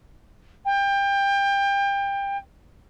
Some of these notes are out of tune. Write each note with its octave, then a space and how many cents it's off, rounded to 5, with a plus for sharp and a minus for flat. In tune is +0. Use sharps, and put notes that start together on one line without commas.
G5 +25